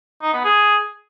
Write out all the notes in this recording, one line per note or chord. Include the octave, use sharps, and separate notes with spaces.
D#4
B3
G#4